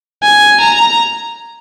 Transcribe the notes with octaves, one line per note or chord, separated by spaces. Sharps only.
G#5
A#5